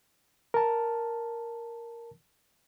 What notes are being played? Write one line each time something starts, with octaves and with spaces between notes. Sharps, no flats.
A#4 A5